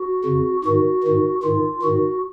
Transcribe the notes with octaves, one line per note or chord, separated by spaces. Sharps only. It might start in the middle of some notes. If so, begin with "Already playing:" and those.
Already playing: F#4
F2 C#3
G#2 D#3 F#4
G#2 D#3
G#2 D#3 F4
G#2 D#3 F#4